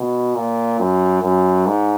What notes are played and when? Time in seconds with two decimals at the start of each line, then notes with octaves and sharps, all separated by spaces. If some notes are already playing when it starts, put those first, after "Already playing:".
Already playing: B2
0.35 A#2
0.79 F#2
1.22 F#2
1.67 G#2